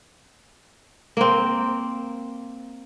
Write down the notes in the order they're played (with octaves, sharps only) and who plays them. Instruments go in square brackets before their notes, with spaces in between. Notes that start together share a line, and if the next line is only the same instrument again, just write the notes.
[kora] A#3 C4